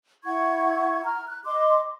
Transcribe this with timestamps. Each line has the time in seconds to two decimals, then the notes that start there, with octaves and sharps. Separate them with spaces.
0.24 E4 F#5 C#6 G#6
1.04 A#5 F6
1.28 F#6
1.45 D#5 C6 D6